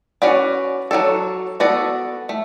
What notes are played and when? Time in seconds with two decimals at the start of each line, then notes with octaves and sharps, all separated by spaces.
0.22 C#4 F#4 B4 D5
0.91 F#3 A3 D4 A4
1.60 B3 F#4 A4 D5
2.29 A3